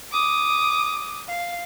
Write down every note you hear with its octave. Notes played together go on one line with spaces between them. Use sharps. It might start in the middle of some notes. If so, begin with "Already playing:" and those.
D6 D#6
F5